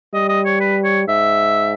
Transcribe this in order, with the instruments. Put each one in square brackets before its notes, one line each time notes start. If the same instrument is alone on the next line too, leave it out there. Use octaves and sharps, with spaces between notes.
[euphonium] G3 [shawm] D#5
[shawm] D#5
C#5
B4
C#5
[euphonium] G#2 [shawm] E5